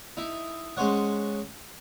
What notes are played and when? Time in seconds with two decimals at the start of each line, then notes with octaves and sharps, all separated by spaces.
0.17 D#4 E4
0.77 G#3 C#4 C5 C#5 F#5